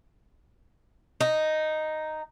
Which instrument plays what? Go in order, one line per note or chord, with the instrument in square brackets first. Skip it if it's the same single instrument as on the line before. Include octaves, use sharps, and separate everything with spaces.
[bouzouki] D#4